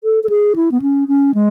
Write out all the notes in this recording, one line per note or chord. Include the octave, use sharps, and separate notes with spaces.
A4
A4
G#4
E4
B3
C#4
C#4
G#3